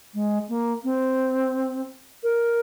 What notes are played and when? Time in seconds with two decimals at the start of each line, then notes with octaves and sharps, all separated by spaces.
0.14 G#3
0.49 A#3
0.84 C4
2.23 A#4